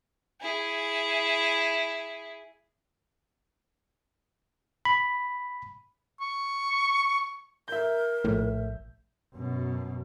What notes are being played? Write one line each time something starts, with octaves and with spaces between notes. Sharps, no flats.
E4 G#4
B5
C#6
A#4 E5 G6
A#1 A2
F#2 B2